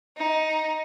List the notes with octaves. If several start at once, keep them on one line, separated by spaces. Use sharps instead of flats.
D#4